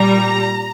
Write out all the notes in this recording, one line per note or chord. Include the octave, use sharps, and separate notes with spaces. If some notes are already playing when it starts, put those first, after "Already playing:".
Already playing: A#2 G3 A#5